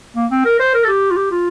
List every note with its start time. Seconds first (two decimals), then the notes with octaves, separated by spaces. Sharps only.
0.16 A#3
0.31 C4
0.45 A#4
0.59 C5
0.74 A#4
0.84 A4
0.88 G4
1.11 F4
1.17 G4
1.31 F4